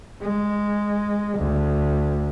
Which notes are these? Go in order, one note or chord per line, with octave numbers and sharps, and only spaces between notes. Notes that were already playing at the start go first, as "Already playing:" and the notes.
G#3
D2